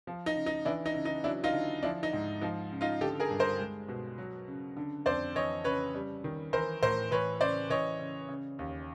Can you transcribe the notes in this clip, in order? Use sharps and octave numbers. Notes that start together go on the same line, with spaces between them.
F3
D#4
C#3
D#4
E3 D4 E4
D#4
C#3
D#4
F#3 D4 E4
D#4 F4
D3
F3 D4 E4
D#4
G#2
F3 D#4
C#3
D#4 F4
D3 G4 A4
G#4 A#4
G2
A#4 C5
G#3
B2
F#3
C#3
D3
F2 C5 D5
E3 C#5 D#5
C#3 B4 C#5
G3
D#3
E3 A#4 C5
A2 A#4 C5
E3 B4 C#5
C#3 C5 D5
E3 C#5 D#5
C#3
C#3
D#2